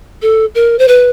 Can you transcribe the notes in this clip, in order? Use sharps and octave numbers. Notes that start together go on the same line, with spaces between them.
A4
A#4
C5
B4